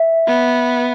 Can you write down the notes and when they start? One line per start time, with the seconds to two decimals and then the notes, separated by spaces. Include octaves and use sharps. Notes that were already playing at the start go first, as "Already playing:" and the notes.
Already playing: E5
0.27 B3